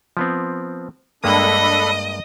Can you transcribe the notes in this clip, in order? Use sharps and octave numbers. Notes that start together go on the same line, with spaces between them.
F3 B3 C4
G2 G#3 A#3 D4 A4 D#5 B5 D#6